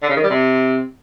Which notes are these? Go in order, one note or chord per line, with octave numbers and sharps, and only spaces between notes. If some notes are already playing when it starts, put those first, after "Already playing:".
D3
C#3
D#3
G3
C3